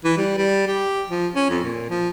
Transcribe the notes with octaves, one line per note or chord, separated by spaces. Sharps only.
E3
G3
G3
G4
F3
C#4
F2
A#2
F3